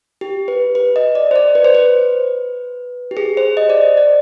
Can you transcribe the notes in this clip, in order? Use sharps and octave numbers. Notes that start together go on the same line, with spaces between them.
G4
B4
B4
D#5
D5
C5
D5
B4
C5
B4
G4
G#4
C5
D#5
D5
C5
D5